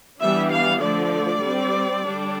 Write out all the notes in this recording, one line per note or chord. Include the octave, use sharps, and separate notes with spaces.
E3 G3 B3 D4 E5
F5
D3 F3 A3 D5
G3 C4
D3 G3 D4